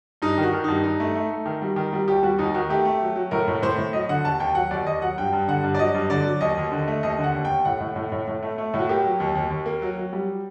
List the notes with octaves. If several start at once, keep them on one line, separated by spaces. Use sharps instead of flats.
G2 D#4
D#3
F#4
D#3
G2 D#4
G2 D#4
A3
A3
A3
D#3
G3
D#3
G3
D#2 G4
G3 F#4
D#2 D#4
D#3 F#4
A3 G4
A3
F#3
F#3
A2 A#4
A2
A2 C5
A2
F#3 D#5
D3 F#5
D#2 A5
D#2 G5
F#3 F#5
D#2 D5
D#2 D#5
F#3 F#5
G2 G5
G2
D3 F#5
G2
D5
F#3 D#5
G2
D3 D5
F#3
D#2 D#5
D#2
D3
A3
D#2 D#5
D3
F#5
D#2
D#2 G5
A2 F#5
A2
A2
A2
A2
A3
A3
A2 F#4
A#3 G4
F#3
D#2
D#2
D#2
A#3
F#3
F#3
G3